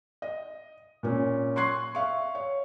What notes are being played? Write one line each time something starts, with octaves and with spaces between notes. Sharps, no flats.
D#5
A#2 C#4
C6 C#6 F#6 G#6 C7
E5 F5 C#6
C#5